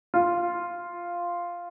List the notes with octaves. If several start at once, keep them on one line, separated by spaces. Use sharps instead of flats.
F4